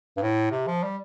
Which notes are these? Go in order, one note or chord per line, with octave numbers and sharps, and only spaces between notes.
G2
A2
C3
F3
G3